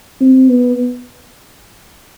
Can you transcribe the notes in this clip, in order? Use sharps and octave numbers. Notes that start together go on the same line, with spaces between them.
C4
B3